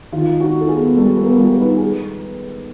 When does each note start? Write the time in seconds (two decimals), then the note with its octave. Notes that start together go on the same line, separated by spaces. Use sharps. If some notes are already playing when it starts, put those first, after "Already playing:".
0.12 D#3 F4
0.33 D#4
0.40 F#4
0.55 D#4
0.61 A4
0.68 G#4
0.76 B3
0.97 G3 A4
1.17 B3 B4
1.26 A#4
1.39 G3
1.53 B4
1.60 D#4
1.76 G#4